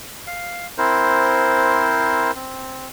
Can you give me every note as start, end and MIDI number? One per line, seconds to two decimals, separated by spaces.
0.27 0.67 77
0.78 2.31 60
0.78 2.31 64
0.78 2.31 70
0.78 2.31 72
2.36 2.88 60